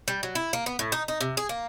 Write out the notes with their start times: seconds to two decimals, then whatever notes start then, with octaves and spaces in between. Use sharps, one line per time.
0.08 G3
0.23 F#3
0.35 E4
0.53 A#3
0.66 B3
0.79 A2
0.92 D#4
1.08 D#4
1.21 C3
1.37 G#4
1.49 A#3